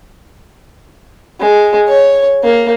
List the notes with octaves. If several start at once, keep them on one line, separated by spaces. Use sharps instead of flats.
G#3
C#5
A#3